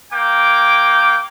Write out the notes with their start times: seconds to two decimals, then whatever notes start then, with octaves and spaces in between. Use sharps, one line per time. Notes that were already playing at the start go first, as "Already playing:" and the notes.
0.12 A#3 G5 D6